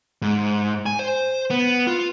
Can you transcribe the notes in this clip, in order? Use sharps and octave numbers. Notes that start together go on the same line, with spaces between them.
G#2
G#5
C5
B3
F4